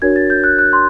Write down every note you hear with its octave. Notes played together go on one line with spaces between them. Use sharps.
D4 F#4 A#4 C#5 G#6
A6
G6
F#6
F#6
C6